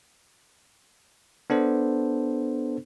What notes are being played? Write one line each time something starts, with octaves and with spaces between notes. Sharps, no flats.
B3 D4 A4 C5